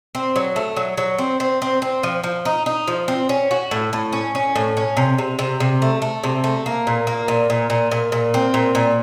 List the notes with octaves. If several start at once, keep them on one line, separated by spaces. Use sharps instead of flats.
C4
F#3
A3
F#3
F#3
C4
C4
C4
C4
F3
F3
D#4
D#4
F3
C4
C#4
F#4
A2
A2
C#4
C#4
A2
C#4
C3
C3
C3
C3
A3
A3
C3
A3
A#3
A#2
A#3
A#2
A#2
A#2
A#2
A#2
C4
A#2
A#2